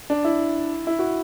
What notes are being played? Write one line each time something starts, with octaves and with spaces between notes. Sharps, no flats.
D4
E4
E4
F#4